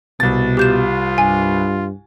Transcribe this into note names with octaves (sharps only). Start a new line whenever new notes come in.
C2 B2 A6
F4 G4 G6 E7
G2 G#5